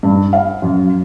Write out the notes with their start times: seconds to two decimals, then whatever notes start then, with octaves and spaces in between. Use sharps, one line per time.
0.03 G2
0.33 F5
0.62 F#2